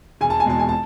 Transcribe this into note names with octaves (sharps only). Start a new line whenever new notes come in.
E1 G#5
A5
G#5
E2 B2 G#3 A5
G#5
A5